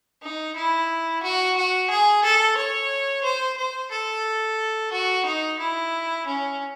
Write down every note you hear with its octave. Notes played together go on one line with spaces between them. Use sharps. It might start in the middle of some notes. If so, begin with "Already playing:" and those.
D#4
E4
F#4
F#4
G#4
A4
C#5
C5
C5
A4
F#4
D#4
E4
C#4